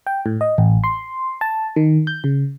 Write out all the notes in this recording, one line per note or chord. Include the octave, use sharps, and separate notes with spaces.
G5
A2
D#5
A1
C6
A5
D#3
G6
C#3